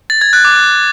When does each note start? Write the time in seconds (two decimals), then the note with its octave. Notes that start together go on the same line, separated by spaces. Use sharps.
0.10 A6
0.21 G#6
0.33 F#6
0.45 D6